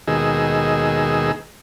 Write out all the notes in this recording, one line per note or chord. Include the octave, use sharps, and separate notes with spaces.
D#2 B2 D#3 G#3 G#4 E6